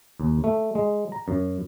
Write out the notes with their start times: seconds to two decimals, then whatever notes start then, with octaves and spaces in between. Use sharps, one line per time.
0.20 D#2
0.44 A3
0.75 G#3
1.12 A#5
1.28 F#2